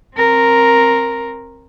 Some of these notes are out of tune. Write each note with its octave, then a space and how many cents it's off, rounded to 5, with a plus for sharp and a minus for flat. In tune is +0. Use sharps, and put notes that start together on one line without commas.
C4 +25 A#4 +0